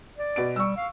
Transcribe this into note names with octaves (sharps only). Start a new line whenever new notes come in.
D5
B2 D7
G3 C#6 E6
F5